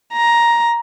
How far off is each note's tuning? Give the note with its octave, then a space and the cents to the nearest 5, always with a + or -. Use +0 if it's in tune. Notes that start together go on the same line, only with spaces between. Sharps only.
A#5 +10